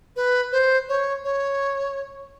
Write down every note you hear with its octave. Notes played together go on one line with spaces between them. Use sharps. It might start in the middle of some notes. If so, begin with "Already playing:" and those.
B4
C5
C#5
C#5